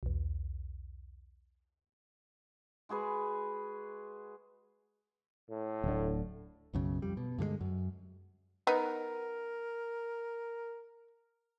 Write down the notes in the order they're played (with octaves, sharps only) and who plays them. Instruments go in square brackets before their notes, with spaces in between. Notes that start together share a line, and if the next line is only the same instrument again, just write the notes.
[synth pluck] B1 E2
[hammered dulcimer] G#3 F#4 G#4 B4
[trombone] A2
[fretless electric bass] D1 D3
[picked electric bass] B1 F#2 C#3
F2 G3
B2
G2 D3 D#3 G#3
F#2
[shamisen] B3 D#4 [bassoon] A#4